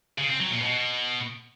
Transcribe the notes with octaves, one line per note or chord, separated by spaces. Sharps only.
C#3
C4
F#3
A#2
B2